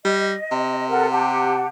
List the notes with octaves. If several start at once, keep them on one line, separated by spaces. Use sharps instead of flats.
G3 D#5
C3
A4 A#4 F#5
G4 F#5 A5